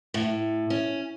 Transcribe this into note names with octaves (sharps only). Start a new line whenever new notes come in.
A2
C#4